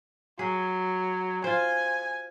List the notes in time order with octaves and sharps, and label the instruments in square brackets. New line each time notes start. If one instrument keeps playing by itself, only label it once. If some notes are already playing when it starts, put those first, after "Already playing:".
[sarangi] F#3 [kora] G#4
[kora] F4 C5 [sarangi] G#5